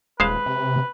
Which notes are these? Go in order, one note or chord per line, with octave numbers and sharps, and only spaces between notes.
D#1 G#3 B4 C5 F5
C3